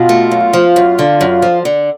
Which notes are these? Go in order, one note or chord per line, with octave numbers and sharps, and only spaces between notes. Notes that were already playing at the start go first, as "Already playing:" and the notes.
Already playing: B2 F4
A3
F#2
F3
F#2
D3
F#2
F3
D3